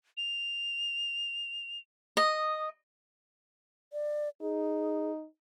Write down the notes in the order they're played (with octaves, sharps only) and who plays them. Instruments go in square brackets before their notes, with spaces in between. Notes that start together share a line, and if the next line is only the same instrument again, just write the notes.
[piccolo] F7
[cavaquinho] D#5 [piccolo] D#6
[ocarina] D5
[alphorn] D#4 [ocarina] G#4